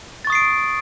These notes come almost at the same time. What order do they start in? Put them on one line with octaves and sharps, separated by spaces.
A6 C#6 D#6 C7 D7